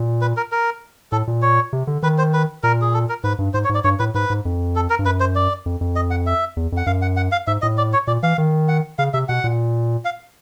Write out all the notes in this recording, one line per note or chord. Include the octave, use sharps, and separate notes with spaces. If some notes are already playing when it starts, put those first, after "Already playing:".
Already playing: A#2
B4
A#4
A#4
A2 A4
A#2
C#5
C3
D3
D#3 B4
C5
B4
A#2 A#4
G#4
A4
A#4
G#2 B4
G2
G#2 C5
C#5
G#2
D5
G2 C#5
A2 B4
G#2 B4
G#2
F2
A4
A#4
G2
F#2 B4
C5
D5
F2
F2
D#5
F#5
E5
E2
F2 F#5
F#2 F5
F#5
F#5
F5
G#2 E5
A2 D#5
D5
C#5
A#2 D5
E3 F5
D#3
F#5
C#3 F5
C3 E5
B2 F#5
A#2
F5